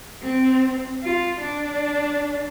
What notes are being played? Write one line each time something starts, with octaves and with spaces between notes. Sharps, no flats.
C4
F4
D4